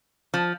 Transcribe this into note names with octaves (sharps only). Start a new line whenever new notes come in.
F3